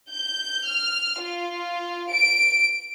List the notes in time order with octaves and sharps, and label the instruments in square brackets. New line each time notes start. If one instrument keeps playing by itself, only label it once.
[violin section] G6
F6
F4
D7